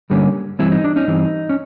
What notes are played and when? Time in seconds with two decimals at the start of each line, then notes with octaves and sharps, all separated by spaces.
0.10 G2 D3 G3 A#3 C#4
0.59 G2 E3 G3 C4 E4
0.72 D#4
0.84 D4
0.96 C#4 D#4
1.07 G2 E3 G3 C4
1.49 C#4